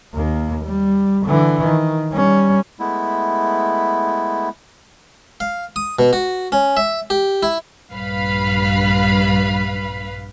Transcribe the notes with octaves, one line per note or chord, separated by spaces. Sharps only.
D#2 A#3
G3
D3 E3
D#3
G3 C#4
G#3 A3 B3 E4
F5
D#6
B2
F#4
C#4
E5
G4
E4
A#1 G2 B4 F5 B5